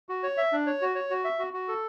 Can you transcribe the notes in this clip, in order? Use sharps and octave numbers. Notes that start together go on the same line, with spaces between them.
F#4
C#5
E5
D4
C#5
F#4
C#5
F#4
E5
F#4
F#4
A4